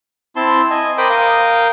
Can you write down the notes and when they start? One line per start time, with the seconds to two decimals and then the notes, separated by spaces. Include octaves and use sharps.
0.36 C4 E4 A5 C6
0.70 D#5 G#5
0.98 A#4 C5 G5 B5 D6 D#6
1.10 A#4 F5 G5 D#6